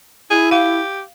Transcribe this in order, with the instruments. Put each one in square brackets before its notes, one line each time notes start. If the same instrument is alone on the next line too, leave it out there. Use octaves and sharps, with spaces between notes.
[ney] E4 [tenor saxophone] G#4
[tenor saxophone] G4 [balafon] F5